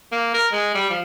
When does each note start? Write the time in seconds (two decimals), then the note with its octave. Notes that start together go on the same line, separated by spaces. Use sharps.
0.12 A#3
0.34 A#4
0.52 G#3
0.74 G3
0.90 F3